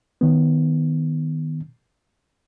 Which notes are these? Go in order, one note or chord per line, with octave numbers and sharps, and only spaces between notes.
D#3 B3